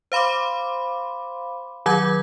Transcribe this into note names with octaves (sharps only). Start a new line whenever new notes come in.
C5 F5 B5 C6 D6
D#3 F#3 F#5 D6 G6 G#6